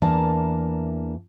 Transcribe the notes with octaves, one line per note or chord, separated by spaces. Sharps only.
E2 E3 A#3 D4 A#4 A5